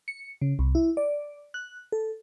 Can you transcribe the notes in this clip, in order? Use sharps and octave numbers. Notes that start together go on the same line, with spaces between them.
C#7
C#3
C2
E4
D5
F#6
A4